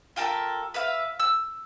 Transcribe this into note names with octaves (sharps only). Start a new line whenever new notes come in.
F4 G4 A4 A#4
B4 E5 F5
E6